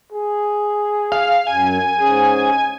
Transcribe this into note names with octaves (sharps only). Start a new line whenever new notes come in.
G#4
F5
F#2 G#5
G#2 C#4 G#4